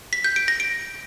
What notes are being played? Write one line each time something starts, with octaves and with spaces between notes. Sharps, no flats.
B6
G6
D7
A#6
D7